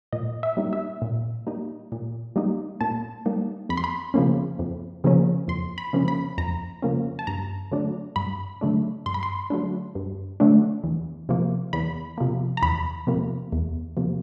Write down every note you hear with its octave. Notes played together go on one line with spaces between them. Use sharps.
A#2 D#5
E5
G3 A#3 D#4
E5
A#2
G3 A#3 D#4
A#2
G3 A#3 D#4
A#2 A5
G3 A#3 D#4
F2 B5
C6
B5
C#3 F3 A#3 C#4
F2
C#3 F3 A#3 C#4
F2 C6
B5
C#3 F3 A#3 C#4
B5
F2 A#5
C#3 F3 A#3 C#4
A5
G2 A#5
D3 F#3 A3 D4
G2 B5
D3 F#3 A3 D4
G2 C6
B5
C6
D3 F#3 A3 D4
G2
D3 F#3 A3 D4
E2
C3 F3 A#3
E2 B5
C3 F3 A#3
A#5
E2 B5
C3 F3 A#3
E2
C3 F3 A#3